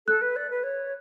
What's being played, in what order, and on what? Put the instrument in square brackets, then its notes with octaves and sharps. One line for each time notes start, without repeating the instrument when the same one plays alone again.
[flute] A4 [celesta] F#6
[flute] B4
D5
B4
C#5